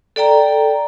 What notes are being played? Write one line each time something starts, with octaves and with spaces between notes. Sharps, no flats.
A4 D5 G5 A#5